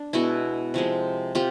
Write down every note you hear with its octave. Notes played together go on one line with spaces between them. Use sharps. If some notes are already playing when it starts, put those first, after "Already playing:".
Already playing: D4
B2 G#3 B3 E4 F#4
C3 F3 G#3
C3 F4 G4